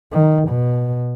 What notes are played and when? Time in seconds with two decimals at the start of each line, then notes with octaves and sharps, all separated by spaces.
0.12 D#3
0.49 B2